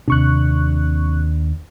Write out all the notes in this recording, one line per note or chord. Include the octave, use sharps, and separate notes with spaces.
D#2 C3 D4 C#6 F#6